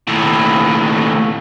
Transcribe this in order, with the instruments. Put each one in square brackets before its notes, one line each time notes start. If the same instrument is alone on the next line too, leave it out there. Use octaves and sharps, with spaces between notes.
[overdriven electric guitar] D#2 A2